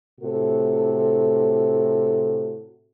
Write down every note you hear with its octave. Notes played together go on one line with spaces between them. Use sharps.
A2 C3 F#4 A4